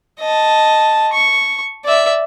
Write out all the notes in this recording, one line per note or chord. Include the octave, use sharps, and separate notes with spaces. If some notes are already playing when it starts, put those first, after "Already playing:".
D#5 A5
C#6
D5 E5